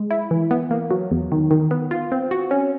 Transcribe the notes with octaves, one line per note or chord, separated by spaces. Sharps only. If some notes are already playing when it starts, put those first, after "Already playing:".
Already playing: G#3
E4
E3
B3
A#3
F#3
E2
D#3
D#3
B3
F4
C4
F#4
C#4